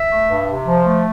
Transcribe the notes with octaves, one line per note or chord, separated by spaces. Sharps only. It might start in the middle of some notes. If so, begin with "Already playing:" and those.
Already playing: E5
A3
G2
C3
F3
A3